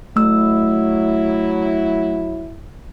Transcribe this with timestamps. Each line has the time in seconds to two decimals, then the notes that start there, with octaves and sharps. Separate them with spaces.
0.16 F#3 A3 E4 E6